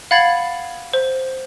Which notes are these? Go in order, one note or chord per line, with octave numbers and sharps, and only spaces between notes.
F5 F#5 B5 G#6 A6 F#7
C5